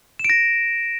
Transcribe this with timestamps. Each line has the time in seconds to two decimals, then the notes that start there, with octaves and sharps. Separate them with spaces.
0.19 E7
0.24 D7
0.30 A#6